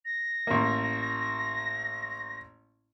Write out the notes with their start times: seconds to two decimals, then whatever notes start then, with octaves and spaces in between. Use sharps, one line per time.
0.05 A#6
0.47 A1 A#3